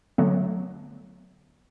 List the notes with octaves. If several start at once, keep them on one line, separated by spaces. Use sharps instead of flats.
D3 F#3 A3 B3